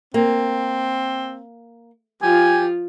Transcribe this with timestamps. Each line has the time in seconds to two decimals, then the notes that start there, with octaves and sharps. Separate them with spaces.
0.14 A#3 C4
2.22 F3 F4 G4 G#5